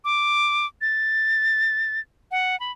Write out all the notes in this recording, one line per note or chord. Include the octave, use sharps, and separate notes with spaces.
D6
A6
F#5
B5